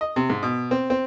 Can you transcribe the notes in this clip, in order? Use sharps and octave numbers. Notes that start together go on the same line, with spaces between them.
D#5
C3
G#2
B2
C4
C4